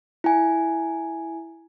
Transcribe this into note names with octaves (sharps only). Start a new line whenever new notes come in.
E4 G#5